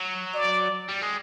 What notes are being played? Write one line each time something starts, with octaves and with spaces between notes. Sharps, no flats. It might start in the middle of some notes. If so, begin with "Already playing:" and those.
Already playing: F#3
D5
G3
G#3